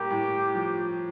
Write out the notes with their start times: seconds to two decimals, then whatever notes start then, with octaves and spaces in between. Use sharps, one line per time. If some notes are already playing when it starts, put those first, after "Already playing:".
Already playing: A2 A#3 G4
0.10 A2
0.55 F3